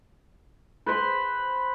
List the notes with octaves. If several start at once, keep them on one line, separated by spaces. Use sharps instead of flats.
B4 C5 B5 C6